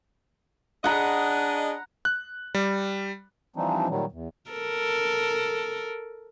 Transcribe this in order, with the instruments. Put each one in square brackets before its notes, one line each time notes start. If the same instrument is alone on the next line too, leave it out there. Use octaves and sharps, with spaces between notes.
[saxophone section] D4 G#4 D#5 [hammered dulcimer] F#5 A#5 B5
[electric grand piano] F#6
G3
[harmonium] E3 F3 G3 C4 D4 D#4
A#2 D#3 F#3 G3
E2
[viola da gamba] A4 A#4